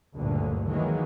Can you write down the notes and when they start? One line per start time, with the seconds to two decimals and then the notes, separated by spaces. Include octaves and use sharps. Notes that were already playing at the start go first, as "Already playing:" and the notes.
0.15 F#1 D2 G2 A#2 D3
0.67 D#3 E3 F#3 G#3 A#3